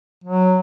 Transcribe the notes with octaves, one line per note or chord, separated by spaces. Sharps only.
F#3